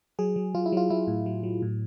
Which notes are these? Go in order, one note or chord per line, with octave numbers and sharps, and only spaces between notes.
F#3 G#4
F#3
F#3 F4
E4
F#3 F4
F#3 E4
A2
F#3
F#3
A2